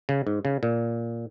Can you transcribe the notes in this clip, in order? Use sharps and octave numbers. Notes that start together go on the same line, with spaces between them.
C#3
G#2
C#3
A#2